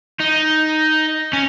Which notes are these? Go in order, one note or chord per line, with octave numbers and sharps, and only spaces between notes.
D#4
C#4